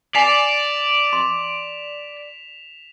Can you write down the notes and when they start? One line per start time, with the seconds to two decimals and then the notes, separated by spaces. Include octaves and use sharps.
0.15 D5 F#5 G#5 B6 E7 F7
1.13 C6